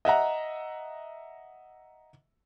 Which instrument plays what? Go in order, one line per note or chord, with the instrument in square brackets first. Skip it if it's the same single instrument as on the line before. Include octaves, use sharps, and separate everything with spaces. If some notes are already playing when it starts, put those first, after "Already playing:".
[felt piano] D#5 E5 F#5 A#5